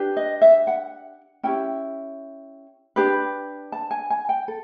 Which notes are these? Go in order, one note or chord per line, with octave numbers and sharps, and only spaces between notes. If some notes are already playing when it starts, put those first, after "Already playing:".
Already playing: D4 G4 B4
D#5
E5
F#5
C#4 E4 G4 G5
D4 G4 B4
A5
G#5
G#5
G5
A4